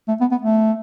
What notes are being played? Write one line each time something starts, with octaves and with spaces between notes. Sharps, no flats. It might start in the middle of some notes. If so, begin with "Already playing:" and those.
A3
B3
B3
A3